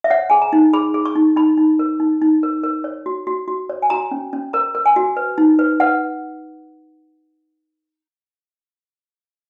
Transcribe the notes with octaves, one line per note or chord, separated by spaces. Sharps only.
E5
C#5 F#5
G#4 G#5
A#5
D#4
G#4 B5
G#4
C#6
D#4
D#4 B5
D#4
A#4
D#4
D#4
A#4
A#4
C#5
F#4
F#4
F#4
C#5
G#5
F#4 A#5
C#4
C#4
A#4 A#5
A#4
G#5
F#4
B4
D#4
B4
B4 F#5